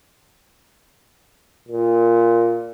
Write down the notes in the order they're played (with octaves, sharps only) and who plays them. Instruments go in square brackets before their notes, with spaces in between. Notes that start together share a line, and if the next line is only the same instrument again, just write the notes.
[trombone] A#2